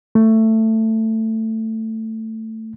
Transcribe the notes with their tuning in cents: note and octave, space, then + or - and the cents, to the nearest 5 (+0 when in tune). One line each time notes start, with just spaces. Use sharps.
A3 +15